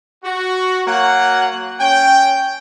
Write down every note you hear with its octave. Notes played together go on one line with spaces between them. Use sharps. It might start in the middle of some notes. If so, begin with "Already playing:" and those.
F#4
F#3 A#3 F#5
C#4 G5